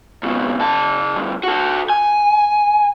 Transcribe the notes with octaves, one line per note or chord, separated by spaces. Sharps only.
C#2 B2
C#3 A5
D2 G2
F#4 A4
G#5